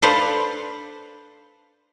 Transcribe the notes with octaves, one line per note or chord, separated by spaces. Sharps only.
D4 A4 B4 C5 F5